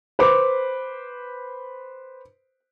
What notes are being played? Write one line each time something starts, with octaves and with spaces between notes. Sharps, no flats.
B4 C5 D6